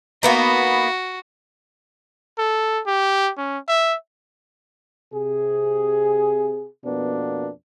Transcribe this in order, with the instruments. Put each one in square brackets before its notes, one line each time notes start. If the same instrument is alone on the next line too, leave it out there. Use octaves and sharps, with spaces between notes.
[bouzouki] A#3 B3 D#4 [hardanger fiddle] F#4
[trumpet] A4
G4
C#4
E5
[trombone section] C3 G#4
F2 B2 A#3 B3 D4